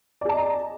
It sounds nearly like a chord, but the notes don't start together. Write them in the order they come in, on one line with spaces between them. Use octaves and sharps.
D5 G#4 A5 D#5 A#5